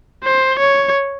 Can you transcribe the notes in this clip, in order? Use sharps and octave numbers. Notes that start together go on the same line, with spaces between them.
C5
C#5